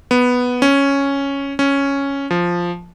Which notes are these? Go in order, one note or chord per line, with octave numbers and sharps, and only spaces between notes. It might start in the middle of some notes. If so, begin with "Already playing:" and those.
B3
C#4
C#4
F3